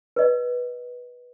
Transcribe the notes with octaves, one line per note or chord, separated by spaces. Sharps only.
B4 D#5